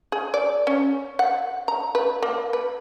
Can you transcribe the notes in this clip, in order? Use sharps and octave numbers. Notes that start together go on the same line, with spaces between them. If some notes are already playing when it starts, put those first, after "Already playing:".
G#4
D5
C#4
F#5
A#5
B4
A#3
B4